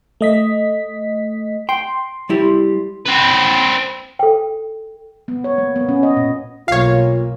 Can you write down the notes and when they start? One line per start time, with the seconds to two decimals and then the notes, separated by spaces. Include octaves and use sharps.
0.21 A3 D#5 B6
1.69 G5 C6
2.29 G3 E4 G4
3.06 C4 B4
4.19 A4 G5
5.28 B3
5.44 C#5
5.58 A#3
5.76 B3
5.89 C#4
6.03 D#5
6.17 A#2
6.68 B1 A#3 F4 C#5 F5